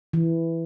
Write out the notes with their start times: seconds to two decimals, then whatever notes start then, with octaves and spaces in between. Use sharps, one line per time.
0.13 E3